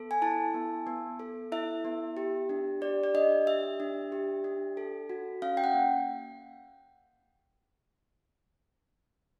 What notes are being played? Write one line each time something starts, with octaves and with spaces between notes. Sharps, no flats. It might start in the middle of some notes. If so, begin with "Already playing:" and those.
Already playing: B3 A4
G#5
E4 A5
B3
B3
A4
E4 E5
B3
G4
D4
G4 D5
D5
D4 D#5
G4 E5
D4
G4
D4
A4
F#4
C#4 F5
G5
F#5
A#3